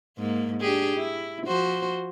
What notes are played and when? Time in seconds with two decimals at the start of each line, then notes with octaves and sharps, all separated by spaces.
0.18 G#2 A#3
0.60 D4 G4 G#4
0.97 E4
1.47 F3 F#4 C5